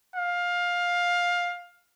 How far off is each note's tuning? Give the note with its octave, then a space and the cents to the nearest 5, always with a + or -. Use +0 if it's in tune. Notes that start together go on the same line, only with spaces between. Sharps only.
F5 +15